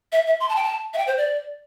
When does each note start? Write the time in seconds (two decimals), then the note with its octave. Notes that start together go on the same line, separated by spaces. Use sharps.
0.12 E5
0.26 E5
0.40 C6
0.49 A5
0.56 G5
0.63 A5
0.94 E5
0.98 G5
1.07 C5
1.18 D5